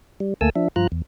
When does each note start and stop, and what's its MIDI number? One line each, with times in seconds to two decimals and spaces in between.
0.20 0.34 55
0.41 0.50 38
0.41 0.50 57
0.41 0.50 58
0.41 0.50 80
0.41 0.50 81
0.41 0.50 88
0.56 0.68 53
0.56 0.68 62
0.56 0.68 76
0.76 0.87 43
0.76 0.87 53
0.76 0.87 65
0.76 0.87 82
0.76 0.87 90
0.92 1.02 40